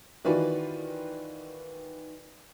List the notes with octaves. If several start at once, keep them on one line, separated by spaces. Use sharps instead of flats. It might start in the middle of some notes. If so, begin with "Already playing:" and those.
D#3 E3 F4 F#4 B4 D5